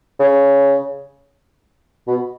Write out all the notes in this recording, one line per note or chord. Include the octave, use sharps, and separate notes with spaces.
C#3
B2